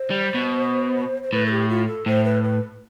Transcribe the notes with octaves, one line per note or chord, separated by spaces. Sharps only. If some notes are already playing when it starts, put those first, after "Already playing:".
Already playing: C5
G3
B2
C5
A2 B4
A4
G4
F4
A4
A2 C5
B4
B4